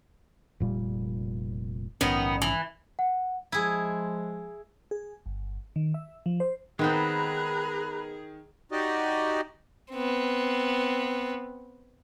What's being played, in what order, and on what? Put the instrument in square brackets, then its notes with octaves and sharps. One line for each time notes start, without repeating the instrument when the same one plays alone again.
[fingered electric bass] F1 A#2 G3
[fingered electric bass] A#1 G#2 C#4 [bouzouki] D#3 B3
[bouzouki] E3
[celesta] F#5
[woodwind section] F3 G#3 [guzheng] E4 G#4
[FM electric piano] G#4
G1
D#3
E5
F3
C5
[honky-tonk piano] D#3 [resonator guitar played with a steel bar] G#3 B3 C4 [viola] G#4 [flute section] A#5 B5 F#6
[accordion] D#4 F#4 G4 D5 D#5
[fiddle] B3 C4